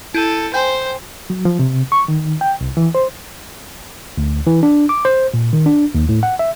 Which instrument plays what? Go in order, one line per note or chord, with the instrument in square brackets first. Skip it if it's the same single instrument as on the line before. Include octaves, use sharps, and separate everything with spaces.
[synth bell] E4 G6 D#7 [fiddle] A4
[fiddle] C5 [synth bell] G5 G#5 G6
[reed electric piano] F#3
F3
C3
C#6
D#3
G5
C2
E3
C5
[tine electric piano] D2
E3
D4
D6
C5
A#2
D#3
D4
D#2
A2
F#5
E5